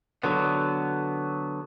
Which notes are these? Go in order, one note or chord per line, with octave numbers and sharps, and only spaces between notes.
D3 F#3 B3